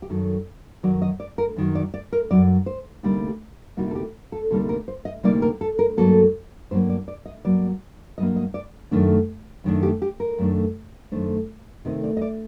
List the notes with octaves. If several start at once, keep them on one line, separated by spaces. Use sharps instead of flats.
G4
F#2 D#3 F#3 A4
F#2 D#3 F#3 D5
D#5
D5
A#4
F#2 D#3 F#3
D5
D5
A#4
F#2 D#3 F#3 D5
C5
D2 C3 G3 A#3 D#4 G4
D2 C3 G3 A#3 D#4 F#4
A4
G4
A4
D2 C3 G3 A#3 D#4 A4
A#4
C5
D#5
D2 C3 G3 A#3 D#4 D5
A#4
A4
A#4
G2 F#3 A#3 A4
G2 F#3 A#3 C5
D5
D5
D#5
G2 F#3 A#3 D5
G2 F#3 A#3 D#5
D#5
D5
F#2 D#3 A3 D4
F#2 D#3 A3 D4
G4
G4
A#4
F#2 D#3 A3 D4
F#2 D#3 A3 D4 C5
C3 D#3 A3 C4 D#4 D#5
D5
D#5
D5